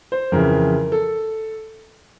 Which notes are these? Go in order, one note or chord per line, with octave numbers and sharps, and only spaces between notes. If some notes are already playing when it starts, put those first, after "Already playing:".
C5
F2 C#3 E3 A#4
A4